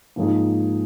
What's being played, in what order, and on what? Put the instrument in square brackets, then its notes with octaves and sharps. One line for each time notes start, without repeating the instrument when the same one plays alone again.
[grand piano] G#2 F3 A#3 D#4 G#4